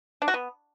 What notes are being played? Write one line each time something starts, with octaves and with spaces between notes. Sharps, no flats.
D4
F#4
B3